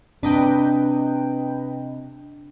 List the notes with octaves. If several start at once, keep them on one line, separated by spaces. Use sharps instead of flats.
C3 D4 B4 D#5 G5